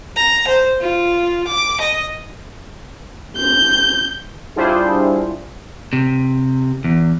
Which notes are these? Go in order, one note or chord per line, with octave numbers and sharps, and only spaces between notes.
A#5
C5
F4
D6
D#5
G6
G3 D4 E4 F4 G#4 C5
C3
E2